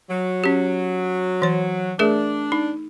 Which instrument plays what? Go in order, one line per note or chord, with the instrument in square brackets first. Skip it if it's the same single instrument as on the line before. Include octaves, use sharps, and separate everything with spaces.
[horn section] F#3
[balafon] C#4 G4
E3 C#5
[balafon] A3 G#4 A#4 [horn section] D4
[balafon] D#4